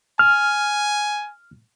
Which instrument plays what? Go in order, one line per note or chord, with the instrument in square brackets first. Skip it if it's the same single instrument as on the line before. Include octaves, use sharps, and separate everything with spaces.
[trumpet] G#5 [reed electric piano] F6